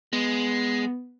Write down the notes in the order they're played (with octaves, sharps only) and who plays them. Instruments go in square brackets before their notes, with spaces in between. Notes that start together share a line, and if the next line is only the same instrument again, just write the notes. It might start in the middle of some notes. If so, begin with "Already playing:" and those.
[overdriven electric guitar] G#3 [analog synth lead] B3